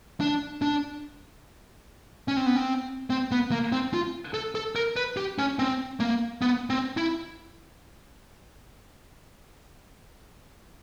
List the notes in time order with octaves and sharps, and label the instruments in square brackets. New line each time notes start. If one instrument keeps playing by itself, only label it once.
[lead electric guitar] D4
D4
C#4
C4
B3
C4
C4
B3
A#3
C4
F4
A4
A4
A#4
B4
G4
C#4
C4
A#3
B3
C4
E4